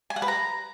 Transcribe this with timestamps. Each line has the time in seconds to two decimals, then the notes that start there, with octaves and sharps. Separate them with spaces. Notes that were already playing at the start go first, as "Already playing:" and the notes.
0.10 G#5
0.16 F#5
0.22 B4
0.28 A#5